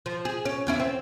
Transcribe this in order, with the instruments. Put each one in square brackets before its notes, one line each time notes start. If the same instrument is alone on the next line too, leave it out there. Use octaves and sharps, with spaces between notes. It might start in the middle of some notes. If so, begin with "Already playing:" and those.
[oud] F3
G#4
C#4
E2 C#4 E4
C4